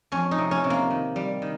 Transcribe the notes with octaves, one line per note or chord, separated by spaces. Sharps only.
F2 C#4
D#4
C3
C#4
C3
A#3
D#3
G3
D#3